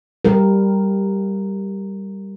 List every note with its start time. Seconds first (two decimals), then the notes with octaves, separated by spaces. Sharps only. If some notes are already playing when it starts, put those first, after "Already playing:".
0.25 G3 A#4